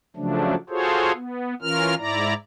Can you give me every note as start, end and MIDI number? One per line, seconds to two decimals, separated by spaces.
0.16 0.55 49
0.16 0.55 53
0.16 0.55 54
0.16 0.55 57
0.16 0.55 62
0.69 1.12 65
0.69 1.12 66
0.69 1.12 68
0.69 1.12 69
0.69 1.12 72
0.69 1.12 73
1.15 1.54 59
1.62 1.95 52
1.62 1.95 61
1.62 1.95 65
1.62 1.95 70
1.62 1.95 89
1.98 2.34 44
1.98 2.34 64
1.98 2.34 74
1.98 2.34 82